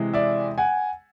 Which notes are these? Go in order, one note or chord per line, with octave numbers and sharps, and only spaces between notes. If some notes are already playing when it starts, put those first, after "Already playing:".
Already playing: C3 E3 G#3
D5 E5
F#5 G#5